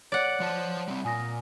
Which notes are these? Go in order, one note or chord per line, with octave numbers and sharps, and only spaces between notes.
C#5 D5 F#5
F3 C5 A5
G3 C4
A#2 G#5 D#6 A#6